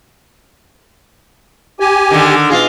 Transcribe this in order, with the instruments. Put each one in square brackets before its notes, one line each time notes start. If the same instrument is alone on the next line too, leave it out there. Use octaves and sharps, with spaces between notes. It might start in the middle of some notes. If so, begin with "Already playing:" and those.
[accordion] G4 G#5
[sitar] D3 D#3
B2 F4 G#4